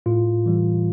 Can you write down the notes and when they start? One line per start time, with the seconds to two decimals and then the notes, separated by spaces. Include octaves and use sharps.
0.06 A2 F4
0.46 E3 G3